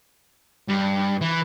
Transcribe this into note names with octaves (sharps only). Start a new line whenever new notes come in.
G2
E3